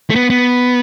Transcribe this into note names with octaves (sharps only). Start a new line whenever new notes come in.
A3
B3
B3